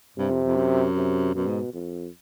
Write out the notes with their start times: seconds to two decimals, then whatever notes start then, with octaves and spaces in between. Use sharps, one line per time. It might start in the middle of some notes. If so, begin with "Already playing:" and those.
0.17 G2 C3
0.31 F2
0.44 F2
0.56 F#2
0.96 C3
1.35 F#2 B2
1.47 G#2
1.74 F2